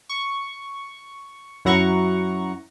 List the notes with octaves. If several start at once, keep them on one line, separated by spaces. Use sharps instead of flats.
C#6
F#2 F#3 E4 F#5 A#5 C#6